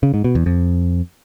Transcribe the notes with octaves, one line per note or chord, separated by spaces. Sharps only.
C#3
G#2
B2
E2
F2